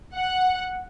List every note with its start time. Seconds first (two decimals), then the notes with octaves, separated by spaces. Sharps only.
0.15 F#5